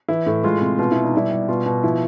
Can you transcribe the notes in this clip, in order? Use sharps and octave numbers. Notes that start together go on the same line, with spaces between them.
E3 E4
A2
G#3 F4
C3
B2 F4
B2 E4
D#4
G3 E4
G3
B2 F4
B2
F3 E4